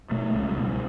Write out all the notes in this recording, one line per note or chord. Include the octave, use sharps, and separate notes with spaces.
B2 A3
C#2 G#3
G3
B2
G3